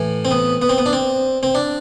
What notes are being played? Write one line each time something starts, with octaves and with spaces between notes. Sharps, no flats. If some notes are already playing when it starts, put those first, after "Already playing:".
Already playing: A2 E3
C4
B3
B3
C4
B3
D4
C4
C4
D4